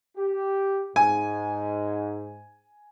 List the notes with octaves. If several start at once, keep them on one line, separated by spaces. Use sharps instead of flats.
G4
G#2 G#5